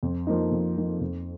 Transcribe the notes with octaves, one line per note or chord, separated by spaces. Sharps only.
F2
F3 A#3 D#4
F2
F3 A#3 D#4
F2